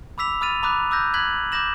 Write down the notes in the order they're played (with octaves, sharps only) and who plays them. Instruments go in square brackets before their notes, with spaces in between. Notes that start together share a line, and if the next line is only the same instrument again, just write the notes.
[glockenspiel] B5 D6 E6 B6 F7
B5 D#6 F6 A6 D#7 F7
A#5 B5 D6 D#6 F#6
D6 E6 F#6 G6 A#6
F#6 G#6 B6 F#7
D6 D#6 G6 A#6 E7 F#7